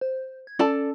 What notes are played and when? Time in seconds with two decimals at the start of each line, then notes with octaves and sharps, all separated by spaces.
0.01 C5
0.47 G#6
0.59 C#4 A4 D5 A5